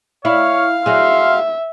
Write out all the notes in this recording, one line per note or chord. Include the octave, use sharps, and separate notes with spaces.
E4 C#5 F5 F6
F#3 G#4 E5 C6